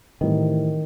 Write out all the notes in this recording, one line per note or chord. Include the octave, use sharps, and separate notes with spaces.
A2 D#3 E3 G3 C4 E4